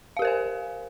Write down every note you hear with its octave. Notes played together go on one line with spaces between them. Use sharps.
G4 A#4 C5 F5 G#5